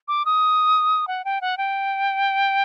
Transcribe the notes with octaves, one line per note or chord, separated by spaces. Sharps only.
D6
D#6
F#5
G5
F#5
G5